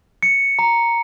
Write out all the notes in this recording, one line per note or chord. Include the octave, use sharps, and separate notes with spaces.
C#7
A#5